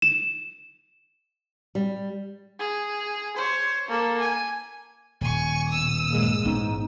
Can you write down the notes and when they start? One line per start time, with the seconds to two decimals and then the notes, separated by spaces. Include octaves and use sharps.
0.02 E7
1.75 G3
2.59 G#4
3.37 C5 C#5
3.89 A#3 A4
4.20 G#5
5.21 D#1 G#5 C#6
5.68 B2 D#6 E6
6.07 A#1 G2 G#3 A#3
6.45 A1 G#2 B3 C#4 D#4